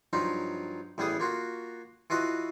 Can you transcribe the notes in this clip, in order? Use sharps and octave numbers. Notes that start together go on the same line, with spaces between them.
G2 F3 F#3 D#4 F4
A1 G3 B3 G#4 D#6
A#3 F4 F#4
E3 F4 F#4 B4 D#5